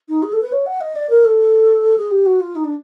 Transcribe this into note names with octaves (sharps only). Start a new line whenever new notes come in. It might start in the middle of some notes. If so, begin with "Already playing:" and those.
D#4
G#4
A4
B4
C#5
F#5
D#5
D5
A#4
A4
G#4
G4
F#4
F4
D#4
D4